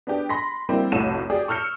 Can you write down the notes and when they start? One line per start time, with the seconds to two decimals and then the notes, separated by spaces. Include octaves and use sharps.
0.07 B3 D4 G4
0.29 B5 C6 A#6 B6
0.69 G3 A#3 C4 E4 G4
0.92 F1 B1 A2 F#4 D#7 E7
1.30 G4 G#4 D5
1.48 C#6 E6 F6 G6 C#7